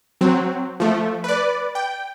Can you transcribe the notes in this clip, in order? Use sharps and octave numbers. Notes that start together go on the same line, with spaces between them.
F#3 C4
F3 A3
B4 D5
G5